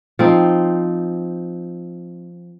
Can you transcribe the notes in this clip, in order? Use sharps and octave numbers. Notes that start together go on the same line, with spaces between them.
F3 C4 D#4